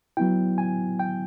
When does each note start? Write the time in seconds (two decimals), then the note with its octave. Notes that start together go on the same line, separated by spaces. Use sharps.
0.17 F#3 B3 E4 G5
0.58 G#5
1.00 G5